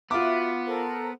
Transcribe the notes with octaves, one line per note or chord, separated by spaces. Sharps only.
B3 F4 F#4 E5 D6
A4 A#4 C5